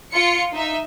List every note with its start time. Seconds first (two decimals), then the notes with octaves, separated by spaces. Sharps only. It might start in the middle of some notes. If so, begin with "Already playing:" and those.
0.12 F4 C#7
0.53 D#4 E5